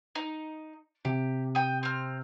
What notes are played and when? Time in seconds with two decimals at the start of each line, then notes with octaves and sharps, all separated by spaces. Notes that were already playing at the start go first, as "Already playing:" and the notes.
0.15 D#4
1.05 C3 G4
1.55 G5 D#6
1.83 C4 F6